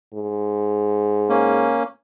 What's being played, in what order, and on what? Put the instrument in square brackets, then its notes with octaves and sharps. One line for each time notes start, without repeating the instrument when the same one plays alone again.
[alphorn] G#2
[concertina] A#3 C#4